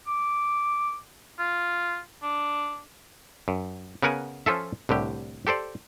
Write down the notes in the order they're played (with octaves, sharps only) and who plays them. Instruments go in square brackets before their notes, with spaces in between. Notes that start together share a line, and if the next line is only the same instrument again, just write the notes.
[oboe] D6
F4
D4
[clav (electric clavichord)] F#2
C#3 B3 A#4 F#5 G#5
F3 C#4 F4 A4 E5
C2 A2 D3 G4
G4 A4 C5 D5